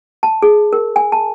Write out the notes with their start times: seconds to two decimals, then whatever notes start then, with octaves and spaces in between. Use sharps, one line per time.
0.23 A5
0.42 G#4
0.73 A#4
0.96 G#5
1.12 A5